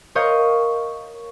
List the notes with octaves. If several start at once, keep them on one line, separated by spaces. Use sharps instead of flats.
A#4 C#5 D#5 F5 C#6 G6